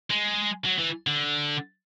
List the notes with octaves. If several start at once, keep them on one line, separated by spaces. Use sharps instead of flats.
G#3
F#3
E3
D3